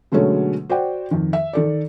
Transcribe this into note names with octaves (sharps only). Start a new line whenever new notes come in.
B2 D3 F#3 G#3 A3 C#4
F#4 C5 D5 F#5 G5
F2 D#3
E5
D#3 A4 D5